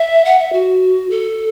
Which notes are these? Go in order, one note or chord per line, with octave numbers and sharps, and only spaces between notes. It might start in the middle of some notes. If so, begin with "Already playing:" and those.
Already playing: E5
F#5
E5
F#4
A4